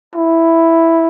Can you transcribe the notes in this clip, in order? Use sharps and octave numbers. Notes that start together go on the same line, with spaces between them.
E4